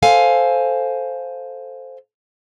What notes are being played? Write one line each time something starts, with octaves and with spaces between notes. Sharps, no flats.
A4 C5 F5 G#5